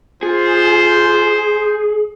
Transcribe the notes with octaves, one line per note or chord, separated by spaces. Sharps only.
F4 G#4 C5